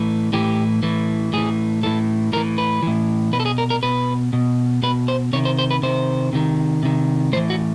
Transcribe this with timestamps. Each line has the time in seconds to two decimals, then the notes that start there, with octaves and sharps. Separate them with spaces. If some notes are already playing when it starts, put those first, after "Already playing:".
Already playing: A2 E3
0.33 A2 E3 G4
0.83 A2 E3
1.33 A2 E3 G#4
1.83 A2 E3 A4
2.33 A2 A#4
2.36 E3
2.58 B4
2.83 A2 E3
3.33 B2 B4
3.40 A4
3.46 G#4
3.58 A#4
3.70 A#4
3.83 B2 B4
4.33 B2
4.83 B2 B4
5.08 C5
5.33 C3 D#3 C#5
5.45 C5
5.59 C5
5.71 B4
5.83 C3 D#3 C5
6.33 C3 D#3
6.83 C3 D#3
7.33 A2 C5
7.36 E3
7.50 F#4